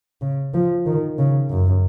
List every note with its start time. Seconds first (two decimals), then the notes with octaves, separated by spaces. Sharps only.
0.21 C#3
0.54 F3
0.86 D#3
1.18 C#3
1.50 F#2